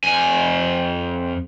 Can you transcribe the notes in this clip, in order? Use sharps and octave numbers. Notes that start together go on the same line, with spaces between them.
F2 G#5